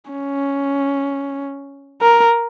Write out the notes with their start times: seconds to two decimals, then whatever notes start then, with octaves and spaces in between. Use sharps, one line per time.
0.11 C#4
2.01 A#4